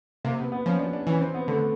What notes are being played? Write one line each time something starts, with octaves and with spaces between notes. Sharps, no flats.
C3 A#3
B3
B3
F3 C#4
D4
D4
E3 C#4
C4
B3
D3 A3